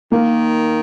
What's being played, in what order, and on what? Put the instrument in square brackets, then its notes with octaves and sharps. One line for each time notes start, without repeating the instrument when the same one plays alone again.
[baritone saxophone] D#3 [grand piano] A#3